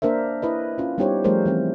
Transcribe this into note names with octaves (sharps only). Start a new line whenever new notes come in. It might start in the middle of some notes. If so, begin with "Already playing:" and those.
A#3 D4 A#4 C5 E5
E4 B4 D#5
C#4 F4
G3 B3 D#4 G4 C5 C#5
F3 G3 A3 G#4 A#4 C5
E3 G3 C4